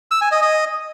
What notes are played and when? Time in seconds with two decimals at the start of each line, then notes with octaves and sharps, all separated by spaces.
0.11 E6
0.21 G#5
0.32 D#5
0.42 D#5